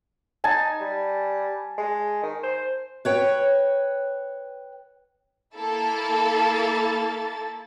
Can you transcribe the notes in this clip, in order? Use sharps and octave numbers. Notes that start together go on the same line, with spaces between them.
D#4 G#5 A5
G3
G#3
D#3
C5
B4 C#5 G5
A#3 E4 A4 A6